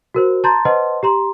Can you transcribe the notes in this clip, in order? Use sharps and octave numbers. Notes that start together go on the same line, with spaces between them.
F#4 A#4 C5
A5 A#5 C6 G6 A6
B4 C5 D#5 F#5 A5 C6
G4 A#5 C6